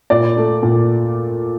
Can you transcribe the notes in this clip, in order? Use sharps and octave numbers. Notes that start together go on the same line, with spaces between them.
A#2 D5
A3
A#2